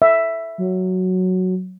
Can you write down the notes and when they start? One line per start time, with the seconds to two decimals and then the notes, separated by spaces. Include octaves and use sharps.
0.02 E5
0.58 F#3